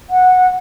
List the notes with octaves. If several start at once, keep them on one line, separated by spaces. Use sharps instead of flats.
F#5